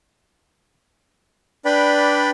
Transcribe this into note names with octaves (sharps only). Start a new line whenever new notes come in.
D4 B4 D5 G5 B5